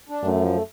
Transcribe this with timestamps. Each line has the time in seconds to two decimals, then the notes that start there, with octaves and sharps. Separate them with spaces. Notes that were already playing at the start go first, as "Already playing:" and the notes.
0.09 D4
0.23 F#2 A3
0.38 F3
0.52 A3